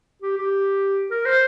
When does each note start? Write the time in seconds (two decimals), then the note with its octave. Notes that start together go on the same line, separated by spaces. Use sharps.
0.22 G4
0.38 G4
1.11 A#4
1.25 C5